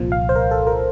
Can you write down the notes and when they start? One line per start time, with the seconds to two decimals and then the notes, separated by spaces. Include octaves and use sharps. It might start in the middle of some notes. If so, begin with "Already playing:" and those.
Already playing: C2 A#2 F3
0.12 F5
0.29 C5
0.36 A#4
0.51 A4
0.67 A#4